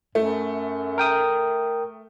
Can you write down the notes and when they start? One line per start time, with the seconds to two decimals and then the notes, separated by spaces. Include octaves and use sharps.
0.15 F#2 A3
0.98 A#4 G5 D#6